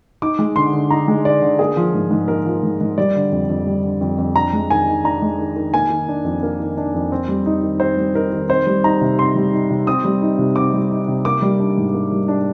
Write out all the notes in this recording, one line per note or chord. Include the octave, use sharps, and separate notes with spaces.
D#4 D6
G#3
D3 C6
D3
D#4 A#5
G#3
D3 D5
D3
A#3 G#4
F3
G#2
G#2
A#3 A#4
F3
G#2
G#2
G3 D5
D3
F2
F2
G3
D3
F2
F2
D4 A#5
G#3
D#3 G#5
D#3
D4 A#5
G#3
D#3
D#3
A#3 G#5
D#3
D4
F2
A#3
D#3
D4
F2
C4
G3
D#4
D#3
C4 C5
G3
D#4 A#4
D#3
C4 C5
G3
D#4 A#5
C3
C4 C6
G3
D#4
C3
C4 D#6
G3
D#4
C3
C4 D6
G3
D#4
C3
A#3 D6
G3
D4
G#2
A#3
G3
D4